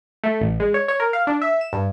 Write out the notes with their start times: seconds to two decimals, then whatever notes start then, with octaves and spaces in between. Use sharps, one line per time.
0.24 A3
0.41 A1
0.60 G#3
0.74 C#5
0.88 C#5
1.00 A#4
1.13 F5
1.27 D4
1.42 E5
1.61 E7
1.73 G2